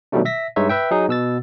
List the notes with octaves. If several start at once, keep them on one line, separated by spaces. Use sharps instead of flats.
B2 D#3 F#3 G3 A3 D4
E5 A#6 B6
G2 G#3 D#4 C#5 E5
B4 E5 G5
F#3 D#4 G#4
B2 E6 A6